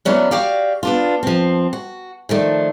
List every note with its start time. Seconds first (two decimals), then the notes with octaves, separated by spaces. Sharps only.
0.05 E3 F#3 B3 C#4 D4
0.31 F#4 G4 D5 F5
0.83 B3 D4 F4
1.23 F3 C4
1.73 F#4
2.29 D#3 F3 A3 D4